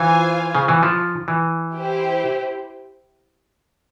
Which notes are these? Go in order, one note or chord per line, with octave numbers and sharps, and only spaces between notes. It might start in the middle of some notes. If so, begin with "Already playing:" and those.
Already playing: E3 F4 C5 F5 G#5
C#3
E3
F3
E3
E4 G4 C5